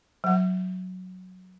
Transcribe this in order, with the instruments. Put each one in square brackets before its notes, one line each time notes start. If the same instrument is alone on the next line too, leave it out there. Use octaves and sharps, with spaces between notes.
[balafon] F#3 F#5